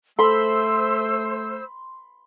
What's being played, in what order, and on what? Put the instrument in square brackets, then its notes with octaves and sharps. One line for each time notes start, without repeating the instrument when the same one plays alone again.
[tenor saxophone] A3 [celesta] A4 [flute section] C5 E6 [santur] B5 C6